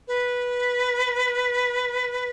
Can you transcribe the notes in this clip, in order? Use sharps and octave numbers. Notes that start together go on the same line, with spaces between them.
B4